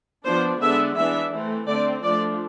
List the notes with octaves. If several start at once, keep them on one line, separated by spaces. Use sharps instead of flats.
F3 B3 D4 C5
D3 G#3 B3 D4 E5
E3 B3 D4 E5
E3 A3 C4
D3 A3 C4 D5
F3 A3 D4 D5